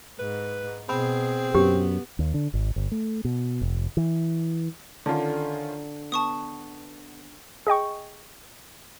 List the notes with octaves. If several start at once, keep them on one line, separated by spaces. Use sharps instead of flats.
G#2 B4
B2 C4 G#4 B5
F#2 B3 G4
D#2
D3
G#1
G1
A3
B2
F1
E3
D3 D#3 C#4 F4
B3 A5 C#6 D#6
G#4 D#5 G5 C#6